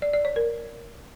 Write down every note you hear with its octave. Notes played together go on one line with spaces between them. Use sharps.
D5
D5
C#5
A#4